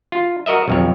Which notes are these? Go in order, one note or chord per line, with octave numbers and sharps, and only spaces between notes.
F4
F#4 A#4 D#5 E5
B1 F2 C#5